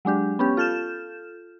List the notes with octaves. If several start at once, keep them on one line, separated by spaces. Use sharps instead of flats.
F#3 G#3 D4 G4
B3 C#4 G4
F4 A4 F6 G6 E7